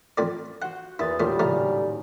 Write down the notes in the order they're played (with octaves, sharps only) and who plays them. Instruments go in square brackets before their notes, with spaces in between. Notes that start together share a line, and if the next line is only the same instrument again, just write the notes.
[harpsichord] F2 A2 D5
[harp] F#4 C5 [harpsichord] F#5
[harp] E2 D#6 A6 [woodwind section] A#2 E3 [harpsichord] E4
[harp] D#1 A1 [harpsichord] A#2 A3 [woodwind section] D3 F#3 G3
[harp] A2 C#3 A#5 [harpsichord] F3 A3